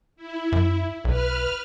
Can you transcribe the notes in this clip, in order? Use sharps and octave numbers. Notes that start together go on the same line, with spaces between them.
E4
F#2
B1 B4 F6